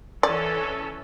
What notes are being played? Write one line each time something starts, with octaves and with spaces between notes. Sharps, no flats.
E3 C#4 A4 D5